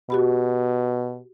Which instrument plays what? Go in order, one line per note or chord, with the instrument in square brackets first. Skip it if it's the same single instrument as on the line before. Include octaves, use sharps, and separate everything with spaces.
[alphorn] B2 [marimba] F#4 G4 B5